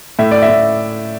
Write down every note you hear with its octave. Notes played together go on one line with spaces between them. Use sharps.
A2 E5
D5
E5
A2